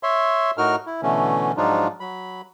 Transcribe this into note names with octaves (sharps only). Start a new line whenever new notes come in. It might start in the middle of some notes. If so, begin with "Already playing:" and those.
C#5 E5 C6
A2 D#4 F#4 A#4 F6
E4
B2 D3 E3 A3 C#4
G#2 F3 F#3 D4 D#4 F4
F#3 B5